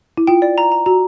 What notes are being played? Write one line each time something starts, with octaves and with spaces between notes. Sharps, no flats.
E4
F4 G5
D5
A#5
A#5
F#4 A#5